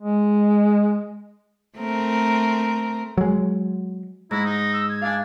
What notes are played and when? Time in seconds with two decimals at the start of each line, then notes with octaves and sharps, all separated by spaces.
0.02 G#3
1.78 A3 C4 A#4
3.18 F#3 G#3
4.31 G#2 E4 A#6
4.44 D#4
4.73 E6
4.89 G#6
5.02 D4 F5 G#5